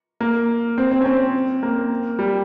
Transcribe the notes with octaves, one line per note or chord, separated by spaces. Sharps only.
A#3
C4
C4
C#4
C4
A#3
G3